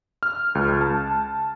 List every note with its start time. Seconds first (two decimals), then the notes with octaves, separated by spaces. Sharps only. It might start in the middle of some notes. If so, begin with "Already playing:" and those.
0.23 F6
0.55 C#2
0.81 A5